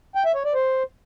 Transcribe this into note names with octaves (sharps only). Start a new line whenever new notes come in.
G5
E5
C#5
D5
C5